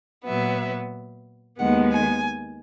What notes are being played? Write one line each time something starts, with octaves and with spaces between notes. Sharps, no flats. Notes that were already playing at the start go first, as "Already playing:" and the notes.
A#2 F#3 B3 E5
D#2 D#3 G#3 B3 F#5
G#5